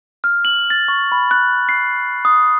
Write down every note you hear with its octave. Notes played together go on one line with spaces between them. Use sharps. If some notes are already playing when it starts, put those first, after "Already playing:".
F6
F#7
A6
C#6
B5
F#6
C7
D#6